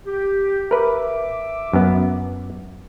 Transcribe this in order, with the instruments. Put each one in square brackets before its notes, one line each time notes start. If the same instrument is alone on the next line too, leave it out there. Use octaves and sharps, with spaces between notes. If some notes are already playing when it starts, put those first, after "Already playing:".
[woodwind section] G4
[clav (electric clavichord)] A#4 B4 [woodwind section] E5 D6
[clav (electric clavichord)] F#2 B3